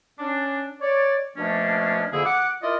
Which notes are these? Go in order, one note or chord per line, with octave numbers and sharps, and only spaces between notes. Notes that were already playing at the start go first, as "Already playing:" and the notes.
C#4 D4
C#5 D5
B2 F3 A3 A#3 C#4 D4
F2 D3 A#3 E4 G#4
F#5 D6
E4 F4 A#4 D5 D#5